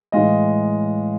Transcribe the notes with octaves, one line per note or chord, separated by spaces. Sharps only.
A2 E3 G#3 D#5 F5